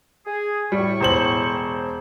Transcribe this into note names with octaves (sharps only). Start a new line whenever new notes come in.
G#4
A2 G3 C#6
E1 C5 F#7